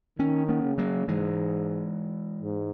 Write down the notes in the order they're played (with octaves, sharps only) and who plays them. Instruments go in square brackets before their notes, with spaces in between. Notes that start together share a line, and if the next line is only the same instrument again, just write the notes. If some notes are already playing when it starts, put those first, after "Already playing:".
[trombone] D#3 [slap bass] A#3 C#4
[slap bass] A#3 C#4
[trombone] C#3
[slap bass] F#3 A#3
[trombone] G#2 [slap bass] E3 G#3
[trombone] G#2